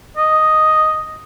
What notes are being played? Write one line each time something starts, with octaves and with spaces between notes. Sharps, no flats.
D#5